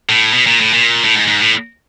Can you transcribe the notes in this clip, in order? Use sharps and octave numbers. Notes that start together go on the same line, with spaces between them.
A2
B2
A#2
A2
A#2
A2
G#2
G#2
A2